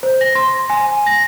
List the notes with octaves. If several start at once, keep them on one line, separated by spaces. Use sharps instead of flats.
C5
A#6
C6
G#5
A#6